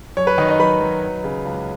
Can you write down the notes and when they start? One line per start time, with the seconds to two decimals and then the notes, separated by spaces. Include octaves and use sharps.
0.17 F#2 C#5
0.27 B4
0.38 D#3 D#4 D#5
0.48 D#4 D#5
0.60 F#2 B4 B5
0.81 F#3
1.03 D#4
1.24 C#3
1.45 C#2